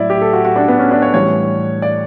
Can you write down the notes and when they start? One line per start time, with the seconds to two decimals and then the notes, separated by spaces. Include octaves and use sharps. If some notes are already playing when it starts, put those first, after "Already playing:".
Already playing: A2 F#3 E4 D5
0.10 G4
0.21 A4
0.33 F#4
0.45 F#4
0.56 D4
0.68 B3
0.79 C#4
0.91 D4
1.02 C#5
1.14 A2 E3 G3 C#5
1.82 D5